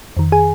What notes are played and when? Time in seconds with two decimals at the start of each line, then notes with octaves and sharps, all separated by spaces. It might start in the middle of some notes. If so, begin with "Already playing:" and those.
0.17 F2 D#3
0.32 G#4 G#5